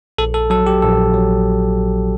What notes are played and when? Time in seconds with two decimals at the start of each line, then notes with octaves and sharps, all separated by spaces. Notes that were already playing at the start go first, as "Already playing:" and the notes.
0.18 A#1 A4
0.34 A4
0.50 F#3 A4
0.67 G4
0.82 A#1 A4
1.14 F#3